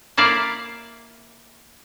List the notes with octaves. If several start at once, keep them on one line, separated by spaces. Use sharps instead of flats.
A#3 E4 D5 F5